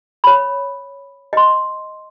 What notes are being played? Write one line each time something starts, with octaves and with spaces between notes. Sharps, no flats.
C#5 B5
D#5 C6